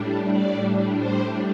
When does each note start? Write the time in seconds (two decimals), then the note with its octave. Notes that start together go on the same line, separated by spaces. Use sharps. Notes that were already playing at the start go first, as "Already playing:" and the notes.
Already playing: A2 G3 D4
0.33 D5
1.00 C5